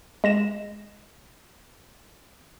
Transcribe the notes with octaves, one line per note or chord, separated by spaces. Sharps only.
G#3 A#6 E7